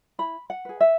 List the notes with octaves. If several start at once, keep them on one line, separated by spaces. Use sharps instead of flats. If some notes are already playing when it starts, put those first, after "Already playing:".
E4 B5
F#5
G#4 B4
E5